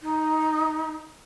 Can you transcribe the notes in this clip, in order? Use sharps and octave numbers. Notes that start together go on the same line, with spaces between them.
D#4